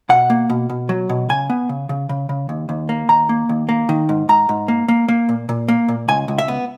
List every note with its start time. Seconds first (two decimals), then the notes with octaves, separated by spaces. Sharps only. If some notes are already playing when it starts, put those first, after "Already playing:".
0.09 B2 F#5
0.30 A#3
0.49 B2
0.70 B2
0.89 F#3
1.09 B2
1.29 C#3 G#5
1.50 B3
1.69 C#3
1.89 C#3
2.09 C#3
2.29 C#3
2.49 D#2
2.69 D#2
2.89 A#3
3.09 D#2 A#5
3.29 A#3
3.49 D#2
3.69 A#3
3.89 D#3
4.09 G#2
4.29 G#2 A#5
4.49 G#2
4.68 A#3
4.88 A#3
5.08 A#3
5.29 A#2
5.49 A#2
5.68 A#3
5.88 A#2
6.08 C#2 G#5
6.28 C#2
6.38 E5
6.48 B3